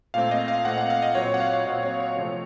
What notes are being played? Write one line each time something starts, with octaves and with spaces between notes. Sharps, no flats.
A#2 A3 C4 F5
D#5
F5
A#2 A3 C4 F#5
F#5
F5
D#5
A#2 F#3 C4 C#5
F#5
F5
F5
A#2 F#3 C4 D#5
C#5
C#5
C3 F3 A3 C4 C#5